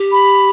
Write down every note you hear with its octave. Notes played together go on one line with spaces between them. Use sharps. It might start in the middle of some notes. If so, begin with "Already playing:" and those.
Already playing: G4
B5